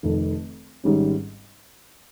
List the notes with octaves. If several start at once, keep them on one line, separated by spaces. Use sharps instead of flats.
F1 F2 D#3
G#1 G#2 G3 C#4